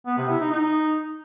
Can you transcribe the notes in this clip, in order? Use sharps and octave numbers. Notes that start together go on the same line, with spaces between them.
B3
C3
E4
D#4
D#4